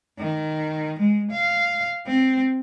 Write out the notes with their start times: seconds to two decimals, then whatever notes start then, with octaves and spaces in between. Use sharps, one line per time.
0.19 D#3
0.99 G#3
1.31 F5
2.07 C4